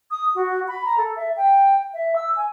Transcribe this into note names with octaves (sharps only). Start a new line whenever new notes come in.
D#6
F#4
B5
A#5
A4
E5
G5
E5
E6
G#5